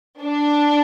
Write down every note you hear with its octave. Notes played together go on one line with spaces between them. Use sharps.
D4